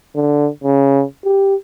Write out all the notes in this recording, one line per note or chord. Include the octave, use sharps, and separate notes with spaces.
D3
C#3
G4